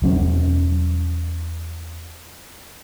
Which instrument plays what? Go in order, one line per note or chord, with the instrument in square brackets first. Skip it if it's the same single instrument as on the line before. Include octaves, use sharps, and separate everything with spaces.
[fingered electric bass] E1 F#3 C#4